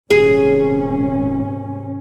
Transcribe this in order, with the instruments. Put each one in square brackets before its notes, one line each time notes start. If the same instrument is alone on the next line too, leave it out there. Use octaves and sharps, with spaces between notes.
[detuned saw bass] D#1 [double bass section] G#1 C3 C#4 [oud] G#4